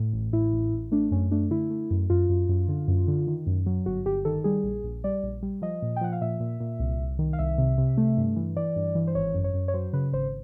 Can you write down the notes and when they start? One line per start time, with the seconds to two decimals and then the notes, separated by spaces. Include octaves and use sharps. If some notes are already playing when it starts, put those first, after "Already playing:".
Already playing: A2
0.13 A1
0.33 A2 E4
0.53 A1
0.73 A1
0.92 A3 D4
1.11 F#2 C#4
1.31 A3 D4
1.50 D3 E4
1.70 A3
1.91 F#2
2.10 F#2 F4
2.29 F#2
2.49 F#2
2.68 D3
2.88 F#2
3.08 D3
3.27 D#3
3.47 F#2
3.66 F#3
3.86 G1 F#4
4.06 G1 G4
4.25 D#3 A4
4.44 G3 G#4
4.64 A#1
4.84 A#1
5.04 G3 D5
5.23 A#1
5.43 G3
5.62 F3 D#5
5.82 A#2
5.96 G5
6.01 F3 F#5
6.13 F5
6.21 A#2 E5
6.40 A#2
6.60 A#2
6.80 C2
7.00 C2
7.19 D#3
7.33 F5
7.39 C2 E5
7.58 C3
7.78 C3
7.97 A3
8.17 G2
8.36 E3
8.56 E3 D5
8.76 G2
8.95 E3
9.07 C5
9.15 G#1 C#5
9.34 F#2
9.44 C#5
9.54 F#2
9.68 C#5
9.74 F#3 C5
9.93 C#3 B4
10.12 G#1 C5